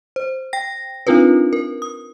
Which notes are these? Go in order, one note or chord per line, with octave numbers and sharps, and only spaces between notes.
C5
G5 A#6
C4 D4 D#4 F4 A#4 B4
A#4
D#6